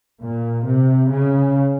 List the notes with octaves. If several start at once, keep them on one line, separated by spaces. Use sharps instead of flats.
A#2
C3
C#3